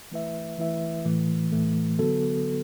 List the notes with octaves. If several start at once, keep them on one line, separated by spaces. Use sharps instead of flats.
E3 A3 E4 B4 E5
E3 A3 E4 B4 E5
A2 E3 A3
A2 E3 A3
D3 F#3 B3 F#4 A4